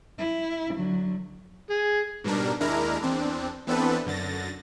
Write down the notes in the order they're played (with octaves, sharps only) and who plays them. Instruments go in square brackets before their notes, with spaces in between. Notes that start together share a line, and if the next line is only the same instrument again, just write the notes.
[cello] E4
D3 F#3
[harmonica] G#4
[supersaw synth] G#2 B2 G3 D4 A#4
D#2 G#3 D4 E4 A#4 A#5
E2 C4 D4
E3 B3 C4 D4 A4 B4
F#2 D3 A6 A#6